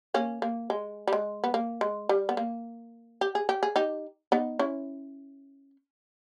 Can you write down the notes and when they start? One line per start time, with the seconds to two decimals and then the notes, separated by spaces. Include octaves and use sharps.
0.14 A#3 C#4
0.42 A#3
0.70 G#3
1.07 G3
1.13 G#3
1.44 B3
1.54 A#3
1.81 G#3
2.09 G3
2.29 B3
2.37 A#3
3.21 G4
3.35 G#4
3.49 G4
3.63 G#4
3.76 D#4 G4
4.32 B3 D#4
4.59 C#4 E4